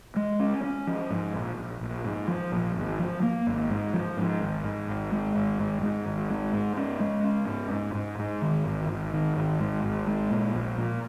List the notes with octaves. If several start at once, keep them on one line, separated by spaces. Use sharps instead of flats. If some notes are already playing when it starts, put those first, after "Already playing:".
G#3
C#4
C#4
F3
G#2
A#1
A#1
A#1
G#2
F3
A#1
G#1
F3
A#3
G#1
G#2
F3
G#2
G#1
G#2
G#1
G#3
G#1
G#2
G#2
G#1
G#3
G#2
C#4
G#3
C#4
G#2
G#2
G#2
G#2
D#3
G#1
G#1
D#3
G#1
G#2
G#1
G#3
A#2
A#1
A#2